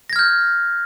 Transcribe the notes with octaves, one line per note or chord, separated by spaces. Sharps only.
F6 G6 G#6 A#6